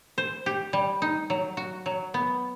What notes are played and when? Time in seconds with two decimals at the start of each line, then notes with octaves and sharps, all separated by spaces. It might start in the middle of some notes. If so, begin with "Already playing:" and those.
0.18 C5
0.46 G4
0.73 G3
1.02 D#4
1.30 F#3
1.57 F#4
1.86 F#3
2.14 B3